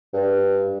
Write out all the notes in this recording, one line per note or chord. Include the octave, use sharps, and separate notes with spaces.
G2